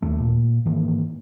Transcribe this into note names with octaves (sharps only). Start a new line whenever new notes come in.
D#2 A3
A#2
G#2 D#3 E3 A#3